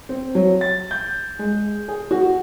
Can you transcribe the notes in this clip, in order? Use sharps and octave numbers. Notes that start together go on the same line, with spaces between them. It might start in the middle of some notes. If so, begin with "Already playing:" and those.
C4
F#3
A6
G6
G#3
G#4
F#4